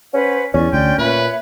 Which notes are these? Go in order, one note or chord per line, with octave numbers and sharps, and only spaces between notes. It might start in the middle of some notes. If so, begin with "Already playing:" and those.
C#4 B4 C5 F#5
E2 C#4 D5 C#6
D2 D5 G5 C6
A#2 B4 C#5 E5 B5